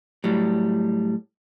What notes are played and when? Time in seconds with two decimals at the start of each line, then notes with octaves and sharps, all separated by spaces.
0.24 A2 F#3 G3